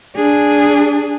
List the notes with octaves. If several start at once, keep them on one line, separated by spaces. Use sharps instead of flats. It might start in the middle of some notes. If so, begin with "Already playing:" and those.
D4 G#4